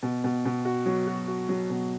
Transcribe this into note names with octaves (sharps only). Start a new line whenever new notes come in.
B2
B2
B2
F#4
F#3
F#4
F#4
F#3
B2